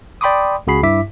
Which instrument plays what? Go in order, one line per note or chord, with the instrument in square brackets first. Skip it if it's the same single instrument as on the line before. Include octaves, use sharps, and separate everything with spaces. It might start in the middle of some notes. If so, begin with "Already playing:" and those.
[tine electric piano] D5 G5 B5 C6 D6 D#6
C#2 C#3 F#4 G#4 B5 C7
G2 E4 E5 D6 B6